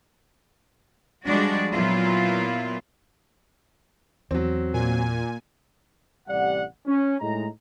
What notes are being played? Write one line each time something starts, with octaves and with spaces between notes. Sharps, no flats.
F3 G3 G#3 D4 F#4 D5
A#2 F#3 A#3 B3 E4 F4
E2 F#3 C4
A#2 G#5
A1 C3 G3 D5 F#5
C#4
A2 G#3 D#4 A#5